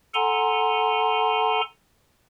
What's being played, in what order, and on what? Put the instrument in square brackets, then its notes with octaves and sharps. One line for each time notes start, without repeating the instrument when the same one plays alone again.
[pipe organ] A4 F#5 G#5 A#5 C6